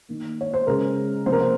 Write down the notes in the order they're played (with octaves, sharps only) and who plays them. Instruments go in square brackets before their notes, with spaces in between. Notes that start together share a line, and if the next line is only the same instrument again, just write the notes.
[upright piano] D#3 A#3
C#5
C5
C#3 G#3 A#4
C3 F3 A#3 C5
A#4
C5